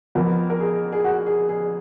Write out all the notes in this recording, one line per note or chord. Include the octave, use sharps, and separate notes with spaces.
F2 F3 B3 A#4
A#4
G#4
G#4
F#4
G#4
G#4